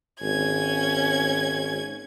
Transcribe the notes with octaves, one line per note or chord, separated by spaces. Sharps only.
G#1 C#4 G#6